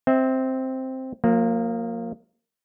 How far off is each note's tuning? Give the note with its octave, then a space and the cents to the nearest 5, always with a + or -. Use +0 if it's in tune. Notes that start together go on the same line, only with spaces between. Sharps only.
C4 +0 E5 -30
F3 +40 A#3 -15